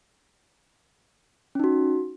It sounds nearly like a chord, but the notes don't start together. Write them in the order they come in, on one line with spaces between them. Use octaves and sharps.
C#4 D#4 F#4